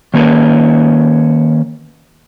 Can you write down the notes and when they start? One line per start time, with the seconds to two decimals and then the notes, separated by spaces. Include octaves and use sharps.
0.14 D#3 A#3 C#4 B4